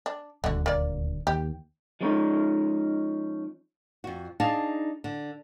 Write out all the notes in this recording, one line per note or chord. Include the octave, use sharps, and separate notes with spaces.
D4
D#1 D2 D3 F#4
A#3 D5
D#2 G4
F3 G#3 C#4 D#4
F2 F#4
D4 D#4 G#4 F5 A5
D3